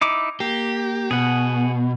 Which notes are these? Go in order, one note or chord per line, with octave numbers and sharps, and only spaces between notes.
D#4 E4 D6
A#3 G4
B2 G#4 F#5